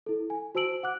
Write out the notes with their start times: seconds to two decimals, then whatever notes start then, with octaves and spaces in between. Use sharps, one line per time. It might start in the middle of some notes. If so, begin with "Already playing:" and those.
0.06 E4 A4
0.30 G#5
0.55 F#4 C5 A5 E6 D7 F#7
0.83 F#5 D6 F#6